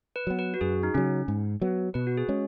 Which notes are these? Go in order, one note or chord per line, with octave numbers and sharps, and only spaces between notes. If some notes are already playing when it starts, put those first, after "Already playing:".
B4
F#3 B3
B4
F#4
F#2 G#4
D#4
C#3 F#3 C#4
G#2
F#3 B3
B2 B4
F#4
G#4
G#3 C#4